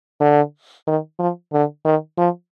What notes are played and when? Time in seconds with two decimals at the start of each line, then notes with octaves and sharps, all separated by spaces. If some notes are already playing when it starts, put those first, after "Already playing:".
0.20 D3
0.87 D#3
1.19 F3
1.53 D3
1.85 D#3
2.18 F3